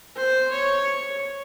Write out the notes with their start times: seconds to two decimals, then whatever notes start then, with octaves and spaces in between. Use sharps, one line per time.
0.16 C5
0.51 C#5